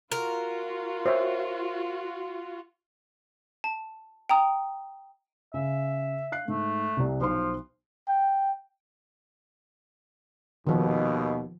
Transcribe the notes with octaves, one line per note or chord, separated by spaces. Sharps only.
F4 F#4 A#4
C5 C#5 E5
A5
G5 A#5 D#6
C#3 E5
F5 F#6 C7
G#2 A3
C2 C3
B1 F3 C5 C6
G5
D#2 B2 D#3 F3